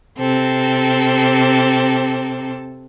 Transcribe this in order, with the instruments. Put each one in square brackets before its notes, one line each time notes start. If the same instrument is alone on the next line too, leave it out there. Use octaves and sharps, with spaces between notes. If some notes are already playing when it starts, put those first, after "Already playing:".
[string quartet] C3 C4 A4